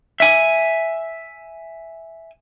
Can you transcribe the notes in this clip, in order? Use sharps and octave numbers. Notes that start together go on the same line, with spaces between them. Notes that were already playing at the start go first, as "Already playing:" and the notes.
E5 G#5